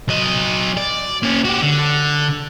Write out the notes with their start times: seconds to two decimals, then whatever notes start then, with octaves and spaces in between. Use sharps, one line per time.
0.09 F#3 D#5
0.77 D5
1.23 A#3 C#4
1.45 F#4 G4
1.62 D3